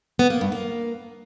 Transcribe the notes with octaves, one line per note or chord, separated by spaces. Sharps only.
B3
A#3
G2
A#3